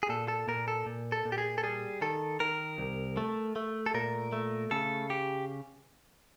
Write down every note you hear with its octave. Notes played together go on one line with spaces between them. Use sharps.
G#4
A#2 A4
A4
A#2 A#4
A4
A#2
A4
A#2
G4
G#4
A4
G3 G#4
D#3 A4
D#3 A#4
C2
A3
A3
A4
A#2 A#4
A3
C#3 A4
G4